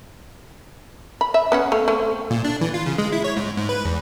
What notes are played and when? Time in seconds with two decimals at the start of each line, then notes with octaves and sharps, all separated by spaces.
1.21 B5
1.34 E5
1.52 B3 C#4 F#5
1.72 A3 F5
1.88 A3 C4
2.31 A#2
2.44 D4
2.61 E3
2.74 F4
2.86 C#3
2.98 G#3
3.12 E4
3.24 C#5
3.37 G#2
3.57 G#2
3.69 B4
3.85 E2